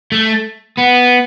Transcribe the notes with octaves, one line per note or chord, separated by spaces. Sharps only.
A3
B3